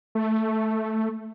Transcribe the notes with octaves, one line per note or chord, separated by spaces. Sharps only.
A3